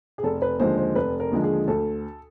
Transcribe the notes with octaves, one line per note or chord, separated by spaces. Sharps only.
G#4
F1 A4
B4
D#2 D3 F3 G#3 C5
C5
F1 B4
A#4
D#2 D3 F3 G#3
G#4
D2 A4